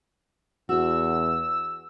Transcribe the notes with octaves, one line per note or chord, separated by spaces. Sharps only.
E2 F#4 E6